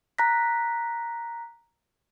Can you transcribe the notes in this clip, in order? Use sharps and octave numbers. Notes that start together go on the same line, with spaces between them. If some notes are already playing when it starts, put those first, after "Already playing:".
A#5 F#6 A#6 B6